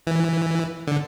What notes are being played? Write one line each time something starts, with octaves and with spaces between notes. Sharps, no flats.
E3
D3